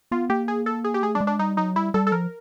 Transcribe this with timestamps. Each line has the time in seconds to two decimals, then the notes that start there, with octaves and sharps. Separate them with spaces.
0.11 B3 F4
0.30 A#3 G4
0.48 G#4
0.66 A4
0.84 G#4
0.94 G4
1.03 A3 G#4
1.15 G3 D4
1.21 G#3
1.27 D4
1.39 G3 D#4
1.57 F#3 D#4
1.76 G3 E4
1.94 G3 A4
2.07 A4
2.12 F3 A#4